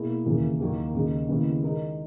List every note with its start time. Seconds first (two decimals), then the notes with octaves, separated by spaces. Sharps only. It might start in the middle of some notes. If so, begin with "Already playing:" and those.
Already playing: B2 A#3 E4 G#4
0.26 E1 D#2 C#3 E3 A#3
0.60 D#2 D#3 F#3 A#3
0.94 D#2 C#3 G#3 D#4
1.29 D#2 C#3 G#3 B3 E4
1.63 D#3 G#3 D#4 A#4